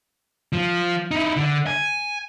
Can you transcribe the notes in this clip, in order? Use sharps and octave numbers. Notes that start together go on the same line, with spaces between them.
F3
D#4 E4
D3
G#5